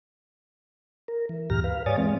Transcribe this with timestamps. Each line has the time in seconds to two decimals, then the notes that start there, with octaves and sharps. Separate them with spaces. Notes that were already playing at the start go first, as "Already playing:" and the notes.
1.08 A#4
1.29 E3
1.50 D2 G2 A#2 G4 A#5 F6
1.64 B4 F5
1.86 G#2 C#5 D5 G#5 D#6 A6
1.97 E3 G#3 C4